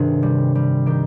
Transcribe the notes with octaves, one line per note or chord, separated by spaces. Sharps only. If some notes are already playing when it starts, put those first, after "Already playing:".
Already playing: G2 C3 D#3 G#4
G3
G3
D#3 G4